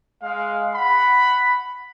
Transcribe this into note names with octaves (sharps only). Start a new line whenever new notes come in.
G#3 F5
F#5 B5